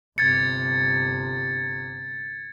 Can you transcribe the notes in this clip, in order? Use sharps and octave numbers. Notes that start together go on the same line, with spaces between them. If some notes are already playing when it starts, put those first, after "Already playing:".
G1 C3 G#6 A6 C#7